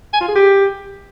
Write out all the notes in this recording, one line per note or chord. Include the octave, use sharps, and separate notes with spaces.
G#5
F4
G#4
G4